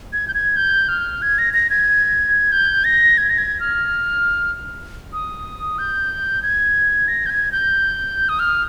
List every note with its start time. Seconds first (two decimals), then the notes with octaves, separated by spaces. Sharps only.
0.13 G#6
0.28 G6
0.34 G#6
0.56 G6
0.89 F6
1.22 G#6
1.38 A#6
1.54 A#6
1.70 G#6
2.52 G6
2.84 A#6
3.18 G#6
3.30 A#6
3.38 G#6
3.60 F6
5.13 D#6
5.78 G6
6.43 G#6
7.08 A#6
7.26 G6
7.30 G#6
7.52 G6
8.29 D#6
8.39 F6